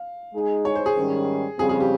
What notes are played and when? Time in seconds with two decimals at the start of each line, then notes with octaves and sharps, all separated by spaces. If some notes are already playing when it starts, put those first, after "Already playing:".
Already playing: F5
0.33 G#3 D#4 G#4
0.65 C#5
0.75 C5
0.86 G#4
0.96 G#2 D#3 G3 C#4
1.59 F2 C#3 G3 C4 G#4
1.69 G#4
1.80 G4